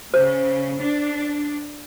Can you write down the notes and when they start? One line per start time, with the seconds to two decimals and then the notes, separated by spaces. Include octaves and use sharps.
0.14 C#3 C5
0.79 D4